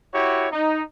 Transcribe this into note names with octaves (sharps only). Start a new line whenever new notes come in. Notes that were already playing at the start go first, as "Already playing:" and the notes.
E4 F#4 G4 C#5
D#4